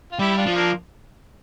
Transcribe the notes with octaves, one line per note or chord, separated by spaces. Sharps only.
F4
G3 E4 G4
D4 F4
F3
A#3 D4